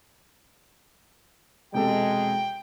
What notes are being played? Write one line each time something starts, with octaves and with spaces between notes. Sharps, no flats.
E1 C3 G#3 A4 G5